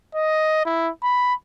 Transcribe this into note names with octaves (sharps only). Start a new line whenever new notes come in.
D#5
E4
B5